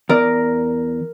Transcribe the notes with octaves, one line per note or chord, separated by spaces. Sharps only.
E2 A#4 D5